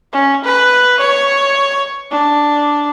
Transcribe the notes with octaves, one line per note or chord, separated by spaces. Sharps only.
C#4
B4
C#5
D4